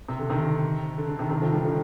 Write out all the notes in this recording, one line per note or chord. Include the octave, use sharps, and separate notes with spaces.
C3
D3
C3 D#3
D3
D3
C3 D#3
C3 D#3
D3 F3
D#3 G3
D3 F3